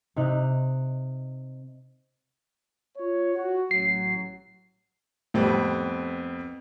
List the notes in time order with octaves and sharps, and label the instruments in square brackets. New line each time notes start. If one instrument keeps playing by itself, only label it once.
[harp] C3 D#4 F#6
[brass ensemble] F4 C#5
F#4
[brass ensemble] A1 F#3 [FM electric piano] C7
[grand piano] F2 B3 C4 [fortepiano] A2 G3